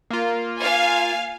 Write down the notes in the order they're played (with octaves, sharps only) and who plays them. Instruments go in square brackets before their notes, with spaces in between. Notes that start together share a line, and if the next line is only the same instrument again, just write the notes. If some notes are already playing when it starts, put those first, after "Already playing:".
[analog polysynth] A#3 F4
[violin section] F5 G#5